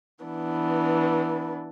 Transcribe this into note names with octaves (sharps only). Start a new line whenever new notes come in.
E3 B3 D4